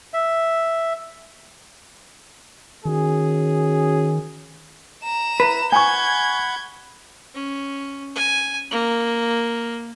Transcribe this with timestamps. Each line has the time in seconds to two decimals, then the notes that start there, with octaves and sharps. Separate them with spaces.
0.14 E5
2.85 D#3 C#4 F#4 G#4
5.03 A#5 E7
5.40 E4 B4
5.72 F#5 G#5 B5 C#6 G6 G#6
7.34 C#4
8.15 G#5
8.71 A#3